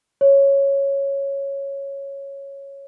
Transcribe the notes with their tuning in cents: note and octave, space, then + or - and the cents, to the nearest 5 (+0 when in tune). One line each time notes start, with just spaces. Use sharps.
C#5 -5